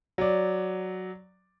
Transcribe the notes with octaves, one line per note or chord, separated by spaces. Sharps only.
F#3 D5